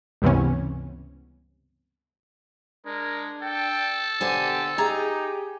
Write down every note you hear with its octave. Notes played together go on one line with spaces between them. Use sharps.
C#2 G2 C3 E3 B3 C#4
G#3 D4 A#4
A4 G5
B2 D3 G4 C5 G#5
D#4 G4 G#4 A#5